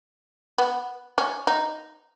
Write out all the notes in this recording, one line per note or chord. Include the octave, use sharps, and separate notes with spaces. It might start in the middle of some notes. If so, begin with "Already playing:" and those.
B3
C#4
D#4